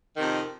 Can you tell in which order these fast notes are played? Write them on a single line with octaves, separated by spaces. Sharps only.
D#3 C3 F2